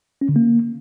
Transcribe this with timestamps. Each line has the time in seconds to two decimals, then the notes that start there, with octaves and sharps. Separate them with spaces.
0.21 C#4
0.29 D3
0.36 A#3